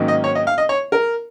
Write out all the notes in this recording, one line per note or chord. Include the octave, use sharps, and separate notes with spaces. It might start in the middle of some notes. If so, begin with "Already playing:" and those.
Already playing: G#2 D#3 F#3 A#3 C#4
D#5
C#5
D#5
F5
D#5
C#5
A#4